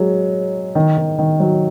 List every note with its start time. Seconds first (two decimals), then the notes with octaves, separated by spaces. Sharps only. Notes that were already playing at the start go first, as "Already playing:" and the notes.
Already playing: F#3 G#3
0.75 D#3
0.98 D#3
1.18 D#3
1.40 F#3